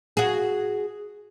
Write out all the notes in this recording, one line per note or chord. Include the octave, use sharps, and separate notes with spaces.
F#4 G#4